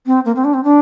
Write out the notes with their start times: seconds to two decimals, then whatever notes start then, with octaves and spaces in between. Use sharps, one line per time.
0.06 C4
0.25 A#3
0.36 C4
0.44 D4
0.54 C4
0.64 D4